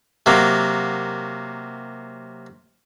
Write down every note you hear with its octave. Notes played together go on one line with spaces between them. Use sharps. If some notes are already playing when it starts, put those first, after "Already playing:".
C3 F#3 A#3